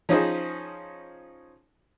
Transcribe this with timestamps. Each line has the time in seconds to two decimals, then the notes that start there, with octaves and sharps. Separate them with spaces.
0.09 F3 C#4 D#4 F4 G#4 C5